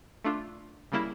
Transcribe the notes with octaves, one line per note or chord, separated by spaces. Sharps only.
A3 D4 F4
C#3 G3 A#3 E4